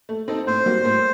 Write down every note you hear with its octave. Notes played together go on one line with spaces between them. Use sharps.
A3
C4 D#4 A4
A2 C5
G3 A#3 F#4
A2